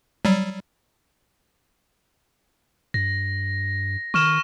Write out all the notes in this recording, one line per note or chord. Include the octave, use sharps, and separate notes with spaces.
F#3 G3
G2 A#6
D#3 C#6 F6 E7